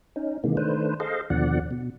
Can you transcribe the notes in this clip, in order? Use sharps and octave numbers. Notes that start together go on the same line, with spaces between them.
C#4 D#4
C3 D#3 E3 G#3 A#3
D#3 A3 D4 B4 C5
G#4 A4 C5 D#5 F5
D#2 B2 D3 F3 D5 F#5
B2